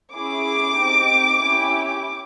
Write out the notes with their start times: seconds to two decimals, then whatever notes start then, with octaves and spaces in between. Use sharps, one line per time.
0.14 C#4 E4 G#4 D6
0.77 C4 D#4 G4
1.41 C#4 E4 G4